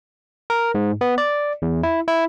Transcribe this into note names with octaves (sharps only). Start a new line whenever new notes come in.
A#4
G#2
B3
D5
E2
E4
E4